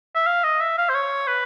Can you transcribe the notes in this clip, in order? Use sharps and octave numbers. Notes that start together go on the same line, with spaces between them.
E5
F5
D#5
E5
F5
C5
C#5
B4